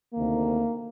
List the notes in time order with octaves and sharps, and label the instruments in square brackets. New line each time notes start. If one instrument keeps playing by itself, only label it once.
[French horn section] D2 C3 D#3 A#3